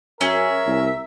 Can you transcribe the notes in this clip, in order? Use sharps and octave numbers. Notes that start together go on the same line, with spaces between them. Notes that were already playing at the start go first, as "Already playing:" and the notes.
F#2 C#4 G#4 A#4 E5
C2